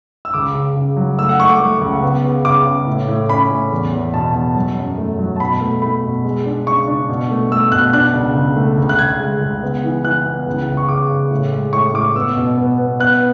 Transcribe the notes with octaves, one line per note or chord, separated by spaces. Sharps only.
E6
C#2 D6
C#3
C#3
F#3
A3 E6
F#5
A3 C#6
D6
A3
C#2
B3
C#3
C#3 D6
C#3
A2
A2
C#4 B5
A2
E2
E2
B2 A5
E2 A5
F#3
F#2
A3
F#3
A5
B2 B5
A3
A3 B5
B2
G#3
D4
C#3 C#6
D4
B2
A3
A3 E6
B2 F#6
D4 F#6
C#2
C#2
A3
C#2
F#6
C#2 G#6
G#3
C#2
B3
E3
E3 F#6
B3
C#2
C#2
C#6
C#3 D6
C#3
A2
G#3
A2 C#6
A2 D6
B3 E6
B2
B3
B3
B3 F#6